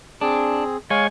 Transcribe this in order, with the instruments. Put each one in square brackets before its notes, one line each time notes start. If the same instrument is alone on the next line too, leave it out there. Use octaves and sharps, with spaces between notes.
[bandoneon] C4 G#4 [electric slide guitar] D4
[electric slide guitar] G#3 [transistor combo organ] C#5 G#5 [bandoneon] F5 C#6